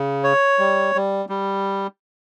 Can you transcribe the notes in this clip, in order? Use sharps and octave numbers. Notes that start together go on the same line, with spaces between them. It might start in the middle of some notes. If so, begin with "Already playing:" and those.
Already playing: C#3
C#5
G3
G3
G3